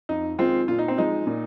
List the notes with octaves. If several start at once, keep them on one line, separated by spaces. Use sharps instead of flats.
F2 D#4
D#3 G#3 C4 F4
A#2 F4
D#4
C4
F3 G#3 D#4
A#2